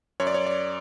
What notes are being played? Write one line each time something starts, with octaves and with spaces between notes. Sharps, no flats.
F#2 C#5
D5
C#5
D5